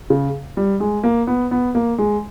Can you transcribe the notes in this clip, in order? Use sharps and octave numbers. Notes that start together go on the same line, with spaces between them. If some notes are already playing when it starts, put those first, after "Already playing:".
C#3
G3
G#3
A#3
B3
B3
A#3
G#3